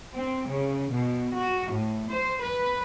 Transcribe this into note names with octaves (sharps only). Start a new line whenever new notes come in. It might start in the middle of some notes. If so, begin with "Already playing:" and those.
C4
C#3
B2
F#4
A2
C5
B4